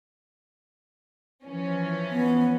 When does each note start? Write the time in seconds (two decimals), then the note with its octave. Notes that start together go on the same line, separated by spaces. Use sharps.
1.45 E3 F3 C#4
2.10 B3